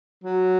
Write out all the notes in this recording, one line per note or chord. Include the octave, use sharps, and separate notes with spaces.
F#3